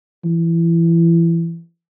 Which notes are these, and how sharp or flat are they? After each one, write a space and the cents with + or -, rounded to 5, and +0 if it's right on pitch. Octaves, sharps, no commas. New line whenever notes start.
E3 +25